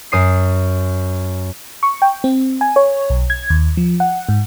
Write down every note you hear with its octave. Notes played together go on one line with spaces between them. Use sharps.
F#2 D#6 C7
C#6
G5
C4
G#5
C#5
B1
G#6
D#2
F3
F#5
G#2